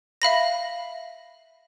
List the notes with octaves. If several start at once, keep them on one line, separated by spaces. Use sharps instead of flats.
E5 F5 B5 A#6